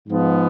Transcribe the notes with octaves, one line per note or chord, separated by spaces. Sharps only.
G#2 F3 B3